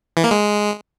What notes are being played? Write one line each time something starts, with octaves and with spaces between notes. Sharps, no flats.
E3
A#3
G#3